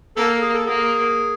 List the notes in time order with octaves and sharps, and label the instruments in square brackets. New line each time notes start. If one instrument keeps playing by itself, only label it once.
[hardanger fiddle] A#3 [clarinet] A4
[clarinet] G#4
A4
[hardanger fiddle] A#3 [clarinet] G#4